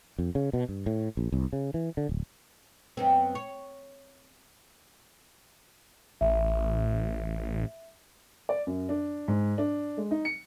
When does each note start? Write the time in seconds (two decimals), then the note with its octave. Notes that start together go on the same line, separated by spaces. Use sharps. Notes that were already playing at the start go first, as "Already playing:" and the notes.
0.19 F2
0.35 C#3
0.53 B2
0.69 G2
0.86 A2
1.17 A#1
1.32 C2
1.53 C#3
1.74 E3
1.97 D3
2.09 D1
2.97 F#2 B3 C4
3.35 C#5
6.21 A1 E5
8.49 D5
8.67 F#2
8.89 D4
9.28 G#2
9.58 D4
9.97 G#3
10.11 D#4
10.25 C#7